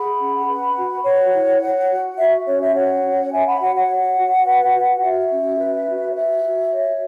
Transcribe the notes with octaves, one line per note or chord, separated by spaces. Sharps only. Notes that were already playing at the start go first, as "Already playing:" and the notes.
Already playing: G#4 F#5 B5
C#4
B4
F#4
B4 C#5 F#5
E4
C#5
F#4
F#4 E5
C#4 C#5
E5
F#4 C#5 F#5
C#4
C#5 E5 G#5
F#5 B5
F#4 C#5 F#5
C#5 F#5
C#5
F#4
B4
F#4
F#4 E5
C#4
B4
F#4
C#5
B4 E5
F#4
C#5